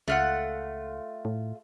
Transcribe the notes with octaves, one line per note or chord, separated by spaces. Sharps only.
C#2 A3 F4 F#5
A2